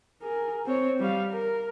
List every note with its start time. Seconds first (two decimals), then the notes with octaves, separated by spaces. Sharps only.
0.22 G#4 A#4
0.66 C4 C#5
1.00 G3 F5
1.32 A#4